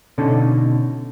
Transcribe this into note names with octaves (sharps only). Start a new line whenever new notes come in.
B2 D3 C#4 D#4 A4